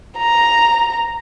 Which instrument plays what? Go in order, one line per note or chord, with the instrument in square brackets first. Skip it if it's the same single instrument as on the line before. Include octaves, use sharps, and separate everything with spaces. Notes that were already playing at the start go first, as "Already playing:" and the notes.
[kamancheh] A#5